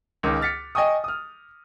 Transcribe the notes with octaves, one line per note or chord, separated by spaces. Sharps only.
C#2 D#3 C#4 D6
F6 A6 B6 C#7
D#5 G5 G#5 C#6 D#6
D#6 F6